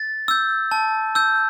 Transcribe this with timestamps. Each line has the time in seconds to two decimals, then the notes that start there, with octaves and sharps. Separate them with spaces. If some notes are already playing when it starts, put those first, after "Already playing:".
Already playing: A6
0.28 E6 G6
0.71 A5
1.15 E6 G6